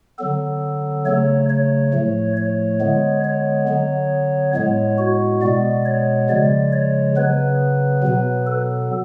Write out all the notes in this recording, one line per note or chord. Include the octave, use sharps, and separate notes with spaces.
D3 F#3 B3 A4
C#3 F#3 A3 C#5
C#5
A2 F3 A3
C#5
D3 G#3 B3
C#5
D3 F#3 B3
A2 G#3 B3 C#5
F#4
B2 G#3 B3 D5
C#5
C#3 F3 G#3 D5
C#5
C#3 F#3 B3 B4
B2 F#3 B3
A4